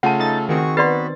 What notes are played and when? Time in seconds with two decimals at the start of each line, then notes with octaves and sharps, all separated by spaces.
0.03 C#3 A3 F4 F#5 A5
0.20 D#4 A4 A6
0.49 D#3 C4 F#4 G#4 C#6
0.77 B3 F#4 B4 D5 B5 C6 A6 C7